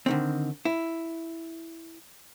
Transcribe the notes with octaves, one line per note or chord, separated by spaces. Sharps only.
D3 D#3 C4
E4